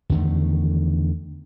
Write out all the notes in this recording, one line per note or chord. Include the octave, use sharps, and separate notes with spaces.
E2 D3 D#3 A3